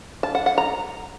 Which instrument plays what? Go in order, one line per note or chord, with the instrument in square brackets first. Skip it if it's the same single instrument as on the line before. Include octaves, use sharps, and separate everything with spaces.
[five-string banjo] A5
F#5
F#5
A#5